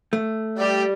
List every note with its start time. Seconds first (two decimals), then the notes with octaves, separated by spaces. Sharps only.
0.13 A3
0.58 G3 G4 D5